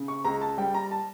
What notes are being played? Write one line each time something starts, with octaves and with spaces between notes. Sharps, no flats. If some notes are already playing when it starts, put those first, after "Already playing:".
Already playing: C#3
C#6
C#2 A#5
A5
G3 G5
A#5
A5